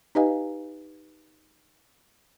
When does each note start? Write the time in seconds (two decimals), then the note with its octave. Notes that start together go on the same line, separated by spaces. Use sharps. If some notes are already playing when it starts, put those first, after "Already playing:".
0.15 D#4 G4 B4 D#5 F5 G#5